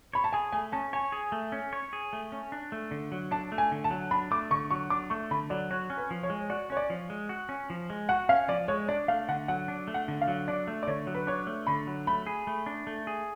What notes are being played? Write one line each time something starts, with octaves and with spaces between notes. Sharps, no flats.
C#5 B5
A5
G#4 G#5
A3 G#5
C#4 A5
C#5 G#5
G#4
A3
C#4
C#5
G#4
A3
C#4
D4
A3
D3
F#3
D4 A5
A3
G#5
D3
A5
F#3
D4 B5
A3 D6
D3 C#6
F#3 C#6
D4 D6
A3 C#6
D3 B5
F#3 D5
F#4 C#5
C#4
B4
F3
C#5
G#3
F#4 D5
C#4 C#5
D5
F3
G#3
F#4
C#4
F3
G#3
F#4 F#5
C#4 F5
F3 D5
G#3 C#5
D4 D5
A3 F5
D3 F#5
F#3 F#5
D4
A3
F#5
D3
F5
F#3
D4 D5
A3
D5
D3 C#5
F#3
B4
D4 C#5
A3
D3 B5
F#3
A3 B5
G#4
A3
D4
A3
G#4